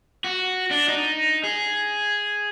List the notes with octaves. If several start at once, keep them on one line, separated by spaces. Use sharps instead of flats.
F#4
D4
D#4
G#4